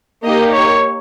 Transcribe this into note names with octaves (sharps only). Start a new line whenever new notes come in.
A#3 D#4 G4 D#5
C#5